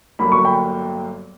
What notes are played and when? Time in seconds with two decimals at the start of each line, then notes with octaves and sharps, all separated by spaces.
0.19 G1 G2 F#3 A#3 B5
0.32 C#6
0.45 G5 B5